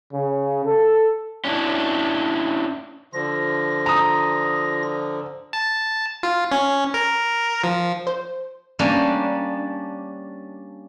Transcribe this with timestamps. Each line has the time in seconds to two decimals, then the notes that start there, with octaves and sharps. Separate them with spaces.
0.13 C#3
0.65 A4
1.44 C#4 D4 E4
3.13 D3 F3 F4 A#6
3.86 A#5 D#6
5.53 A5
6.23 F4
6.52 C#4
6.94 A#4
7.64 F3
8.07 C5
8.79 G3 A#3 C#4 D4